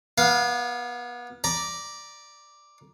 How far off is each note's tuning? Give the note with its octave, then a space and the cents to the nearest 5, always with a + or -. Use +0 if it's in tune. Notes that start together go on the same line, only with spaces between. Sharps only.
B3 -30 F5 +0
D5 +0 A#5 +20